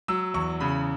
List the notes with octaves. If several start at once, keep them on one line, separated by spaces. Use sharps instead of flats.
F#3 E6
E2 C#6
C#3 B5